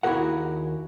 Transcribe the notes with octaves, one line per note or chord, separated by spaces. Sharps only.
D#2 E4 F#4 G#4 A#4 F#5